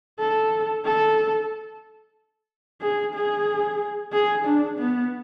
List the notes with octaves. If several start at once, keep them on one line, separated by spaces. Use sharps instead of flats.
A4
A4
G#4
G#4
G#4
D4
B3